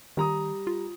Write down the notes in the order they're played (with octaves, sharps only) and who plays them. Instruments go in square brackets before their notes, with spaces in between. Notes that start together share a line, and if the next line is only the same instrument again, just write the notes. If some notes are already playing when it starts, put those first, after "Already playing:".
[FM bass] D#3 [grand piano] G3 A#5 D#6
[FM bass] F4